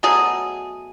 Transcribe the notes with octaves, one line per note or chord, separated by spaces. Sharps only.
B2 F#3 A3 G#4